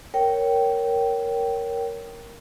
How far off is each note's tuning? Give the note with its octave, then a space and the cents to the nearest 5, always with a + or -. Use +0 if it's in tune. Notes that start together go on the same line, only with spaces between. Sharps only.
A#4 +0 C#5 +0 G5 -15